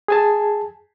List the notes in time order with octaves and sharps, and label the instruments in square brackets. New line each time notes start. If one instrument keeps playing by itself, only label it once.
[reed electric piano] G#4 G#5 A5